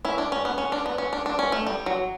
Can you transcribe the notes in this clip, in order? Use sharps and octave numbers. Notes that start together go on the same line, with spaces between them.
C#4 E4
D4
C#4
B3
C#4
D4
B3
C#4
D4
D4
C#4
A3
G3
F#3